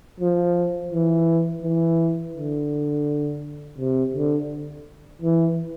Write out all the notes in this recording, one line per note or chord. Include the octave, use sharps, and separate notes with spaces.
F3
E3
E3
D3
C3
D3
E3